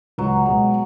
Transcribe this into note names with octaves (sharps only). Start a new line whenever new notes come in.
C#2 F#3
B2 G#3